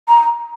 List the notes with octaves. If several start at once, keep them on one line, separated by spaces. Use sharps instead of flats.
A#5